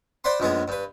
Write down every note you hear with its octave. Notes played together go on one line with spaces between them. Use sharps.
C5 D5 F#5 B5 C6
A#1 F#2 G#3 B3 G#4
G2 B4